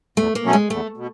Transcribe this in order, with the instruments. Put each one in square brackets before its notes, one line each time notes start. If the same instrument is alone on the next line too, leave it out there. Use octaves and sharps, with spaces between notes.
[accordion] E2 [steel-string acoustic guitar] A3
[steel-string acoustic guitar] A#3
[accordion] B2 F#3 A3 C#4
[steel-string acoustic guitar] G#3
[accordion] E2 [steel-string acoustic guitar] A3
[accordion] B2